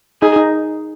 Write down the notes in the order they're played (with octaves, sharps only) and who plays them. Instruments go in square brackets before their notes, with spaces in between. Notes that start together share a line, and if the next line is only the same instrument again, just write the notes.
[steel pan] D#4 [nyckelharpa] G#4
[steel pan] D#4